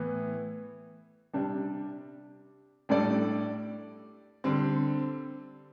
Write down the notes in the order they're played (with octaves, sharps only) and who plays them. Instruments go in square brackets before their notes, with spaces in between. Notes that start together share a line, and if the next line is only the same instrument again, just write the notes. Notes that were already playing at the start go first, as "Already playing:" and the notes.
Already playing: [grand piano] A2 E3 B3 E4
C3 G3 D4
A2 G3 D4 A4 D5
D3 G3 C4